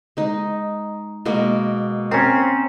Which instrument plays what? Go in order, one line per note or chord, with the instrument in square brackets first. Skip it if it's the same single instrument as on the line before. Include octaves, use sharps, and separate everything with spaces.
[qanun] G#3 D#4
B2 G#3 A#3
[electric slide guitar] C4 C#4 [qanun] A#4